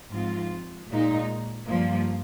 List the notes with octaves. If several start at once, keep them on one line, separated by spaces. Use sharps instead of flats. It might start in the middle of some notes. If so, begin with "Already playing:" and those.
G#2 F3 C4 F4
A#2 G#3 D#4
G2 F3 A#3